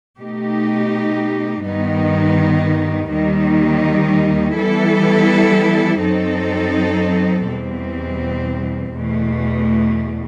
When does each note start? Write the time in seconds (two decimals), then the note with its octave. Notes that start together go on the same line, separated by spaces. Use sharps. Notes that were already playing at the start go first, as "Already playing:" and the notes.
0.19 B2 A3 D#4 G4
1.64 G2 D#3 G3 B3 D#4
3.10 D#2 D#3 G3 D#4
4.56 E3 G3 B3 E4 A4
6.02 F#2 F#3 C4 D#4 A4
7.48 E2 B2 G3 C4
8.94 E2 B2 A3